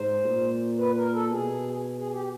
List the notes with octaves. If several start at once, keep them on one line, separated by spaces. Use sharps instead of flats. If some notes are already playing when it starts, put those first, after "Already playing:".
Already playing: G#2 C5
A#2
B4
A#4
A4
B2 G#4
G#4
G4